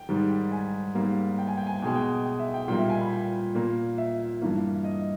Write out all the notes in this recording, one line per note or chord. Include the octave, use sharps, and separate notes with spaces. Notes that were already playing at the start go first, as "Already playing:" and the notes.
Already playing: G5
G#2 D#3 G3
G#5
G#2 G3 A#3
G5
G#5
G5
G#5
G5
B2 G#3 G#5
G5
G5
E5
G5
A#2 G3 A#3 G5
E5
G#5
B5
G5
A#2 A#3
E5
G2 E3 A#3
D#5